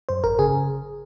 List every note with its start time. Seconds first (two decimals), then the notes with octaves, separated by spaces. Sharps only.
0.09 F#2 C5
0.24 G#1 A#4
0.39 C#3 G#4